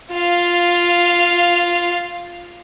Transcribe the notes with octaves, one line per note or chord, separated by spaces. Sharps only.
F4 F5